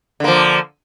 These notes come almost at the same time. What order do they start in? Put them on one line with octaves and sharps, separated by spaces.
D3 A#3 F3